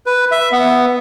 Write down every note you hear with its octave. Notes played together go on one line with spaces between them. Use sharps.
B4
E5
B3